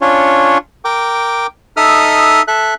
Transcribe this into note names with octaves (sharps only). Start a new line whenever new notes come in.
C#4 D4 F4 C#5
A#4 G5 D6
D#4 A4 D#5 E5 D#6 F6
A4 E5 F#6